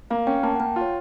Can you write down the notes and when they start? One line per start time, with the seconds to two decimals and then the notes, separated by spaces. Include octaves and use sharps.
0.10 A#3 F5
0.27 C#4 G5
0.43 A#3 A5
0.56 F#5
0.60 A#3 G5
0.76 F4
0.81 C#5